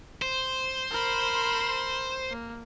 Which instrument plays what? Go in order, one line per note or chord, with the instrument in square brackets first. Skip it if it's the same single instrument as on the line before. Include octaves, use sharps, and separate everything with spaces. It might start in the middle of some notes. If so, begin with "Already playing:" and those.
[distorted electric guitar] C5
[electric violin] A#4 B5
A#3